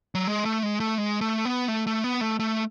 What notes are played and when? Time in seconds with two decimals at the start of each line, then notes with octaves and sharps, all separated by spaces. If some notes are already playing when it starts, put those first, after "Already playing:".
0.15 F#3
0.27 G#3
0.45 A3
0.63 G#3
0.80 A3
0.98 G#3
1.21 A3
1.45 B3
1.68 A3
1.87 A3
2.04 B3
2.21 A3
2.40 A3